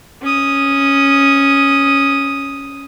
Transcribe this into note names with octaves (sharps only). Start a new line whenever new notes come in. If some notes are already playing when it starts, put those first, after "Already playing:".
C#4 D#6